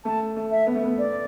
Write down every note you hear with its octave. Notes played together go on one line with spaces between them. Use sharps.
A3 A5
A3
E5
B3
A3
B3
D5